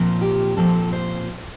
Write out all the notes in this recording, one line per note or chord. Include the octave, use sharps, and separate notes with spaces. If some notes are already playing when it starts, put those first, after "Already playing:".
Already playing: A#2 F3 C4
G4
A#2 F3 C4 A4
C5